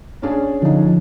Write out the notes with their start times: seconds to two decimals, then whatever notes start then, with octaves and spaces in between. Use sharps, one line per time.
0.22 C#4 D4 G#4
0.62 D3 F3 D#4